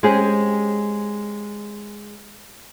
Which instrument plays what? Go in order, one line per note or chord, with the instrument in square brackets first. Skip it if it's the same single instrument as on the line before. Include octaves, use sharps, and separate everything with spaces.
[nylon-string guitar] G#3 C4 C#4 G4 G#4